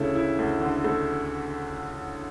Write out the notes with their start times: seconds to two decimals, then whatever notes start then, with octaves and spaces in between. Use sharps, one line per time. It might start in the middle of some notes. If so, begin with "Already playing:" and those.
Already playing: D2 C#3 A3 E4
0.15 E4
0.39 D2
0.61 D3
0.84 A3